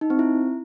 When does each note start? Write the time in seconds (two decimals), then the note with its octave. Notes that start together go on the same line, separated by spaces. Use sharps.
0.01 D#4
0.10 C4
0.19 E4